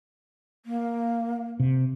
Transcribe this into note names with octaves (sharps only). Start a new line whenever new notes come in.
A#3
C3